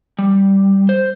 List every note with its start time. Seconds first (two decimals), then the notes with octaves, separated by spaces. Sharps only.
0.19 G3
0.89 C5